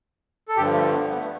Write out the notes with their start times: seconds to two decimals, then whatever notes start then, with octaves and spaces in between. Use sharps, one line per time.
0.49 A4
0.57 G2 D3 F3 G4
0.74 A3
0.92 B3
1.10 B3
1.18 A3